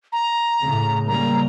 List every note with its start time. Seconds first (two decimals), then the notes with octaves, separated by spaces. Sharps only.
0.13 A#5
0.62 A2 C#3
1.07 C#3 G3 A#3 A#5